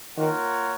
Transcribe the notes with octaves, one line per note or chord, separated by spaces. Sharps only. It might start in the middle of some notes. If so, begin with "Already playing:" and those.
D#3 A#3 F4 A#4 C#5 F#5